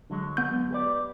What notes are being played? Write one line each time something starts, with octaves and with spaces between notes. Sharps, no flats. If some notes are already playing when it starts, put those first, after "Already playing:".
D3 F#3 G#3
B3 G6
G4 B4 D5